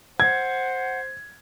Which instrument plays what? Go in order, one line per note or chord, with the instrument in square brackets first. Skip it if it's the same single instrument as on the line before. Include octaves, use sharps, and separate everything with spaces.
[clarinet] C5 [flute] F#5 [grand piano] G#6